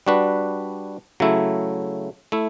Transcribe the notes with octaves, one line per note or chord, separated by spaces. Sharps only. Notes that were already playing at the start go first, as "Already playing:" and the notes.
G3 D4 F#4 B4
C#3 F#3 A3 E4
A3 E4